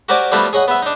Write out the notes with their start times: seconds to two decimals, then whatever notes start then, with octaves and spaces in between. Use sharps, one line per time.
0.09 F#4 G4 A#4 C5 D5 G#5
0.32 F3 G3 A3 B3 F4 F#4
0.53 G#4 C#5 D#5 F#5
0.68 B3 E5
0.82 D4 D#4